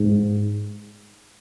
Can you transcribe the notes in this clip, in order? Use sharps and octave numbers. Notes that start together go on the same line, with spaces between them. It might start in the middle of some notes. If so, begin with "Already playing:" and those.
Already playing: G#2